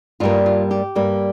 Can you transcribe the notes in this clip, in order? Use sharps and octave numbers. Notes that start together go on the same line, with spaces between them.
G2 G3 A#3 F4
F4
G4
G2 G3 A#3